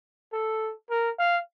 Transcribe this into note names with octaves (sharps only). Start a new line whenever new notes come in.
A4
A#4
F5